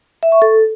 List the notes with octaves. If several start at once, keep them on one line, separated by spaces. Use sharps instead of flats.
E5
C#6
A4